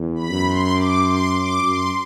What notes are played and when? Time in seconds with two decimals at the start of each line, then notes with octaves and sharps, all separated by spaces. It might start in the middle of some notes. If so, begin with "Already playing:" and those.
Already playing: E2
0.15 B5
0.30 F#2
0.45 C6
0.73 D6
1.03 C6
1.33 D6
1.62 F#2 C6